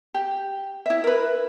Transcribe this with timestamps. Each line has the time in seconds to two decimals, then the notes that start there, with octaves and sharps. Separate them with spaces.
0.14 G4
0.86 E4 E5
1.04 A#4 B4